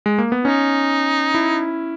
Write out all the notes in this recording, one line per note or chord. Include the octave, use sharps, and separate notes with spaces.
G#3
A#3
B3
C#4 D#4
E4